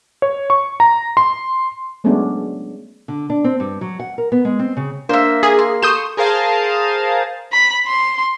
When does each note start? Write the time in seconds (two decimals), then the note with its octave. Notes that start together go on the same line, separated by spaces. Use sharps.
0.22 C#5
0.50 C#6
0.80 A#5
1.17 C6
2.04 F#3 G#3 A3 B3 C#4 D4
3.08 D3
3.30 D4
3.44 C4
3.60 G2
3.81 F#3
4.00 F#5
4.18 A#4
4.32 B3
4.45 G#3
4.59 C4
4.77 C#3
5.09 A#3 D4 C5 E5 F5
5.43 G#4
5.59 C6
5.82 G4 A4 C6 C#6 D#6 G6 E7
6.17 G#4 A#4 C5 F5 A5 D#6
7.52 B5
7.87 C6